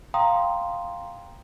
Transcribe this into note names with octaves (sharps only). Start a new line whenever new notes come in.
F5 G5 A#5 C6 D#6